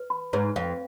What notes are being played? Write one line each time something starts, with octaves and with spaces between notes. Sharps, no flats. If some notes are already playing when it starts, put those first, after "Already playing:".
Already playing: B4
B5
G#2 B4
F2 F5